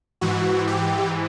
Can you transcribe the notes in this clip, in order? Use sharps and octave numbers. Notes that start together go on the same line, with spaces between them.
G#2 E3 F#4
G4